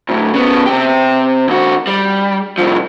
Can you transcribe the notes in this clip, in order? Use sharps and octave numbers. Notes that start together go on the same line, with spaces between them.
D2 A2
C#3 B3
C3 G4
D#2 F#4
G3
C2 F3